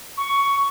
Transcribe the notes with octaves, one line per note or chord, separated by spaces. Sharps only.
C#6